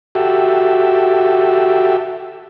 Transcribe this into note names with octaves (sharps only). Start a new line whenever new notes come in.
F#4 G4 A4 E5